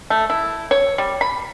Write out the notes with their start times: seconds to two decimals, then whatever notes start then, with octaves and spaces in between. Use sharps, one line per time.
0.10 A3
0.30 E4
0.71 C#5
0.98 G3
1.21 B5